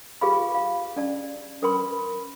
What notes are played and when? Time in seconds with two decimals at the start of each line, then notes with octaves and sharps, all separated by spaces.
0.21 F4 G4 G#4 B4 F5 B5
0.55 F5
0.96 C#4 D5 A5
1.62 C#4 A#4 B4 G5 B5 C6